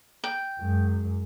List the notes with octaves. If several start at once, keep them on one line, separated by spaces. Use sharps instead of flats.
G5
F#2 G#3